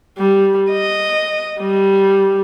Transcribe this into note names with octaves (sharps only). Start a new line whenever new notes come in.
G3
D#5
G3